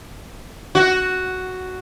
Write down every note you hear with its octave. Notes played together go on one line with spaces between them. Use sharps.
F#4